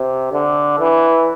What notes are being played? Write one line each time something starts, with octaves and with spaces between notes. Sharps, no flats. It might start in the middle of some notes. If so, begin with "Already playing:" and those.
Already playing: C3
D3
E3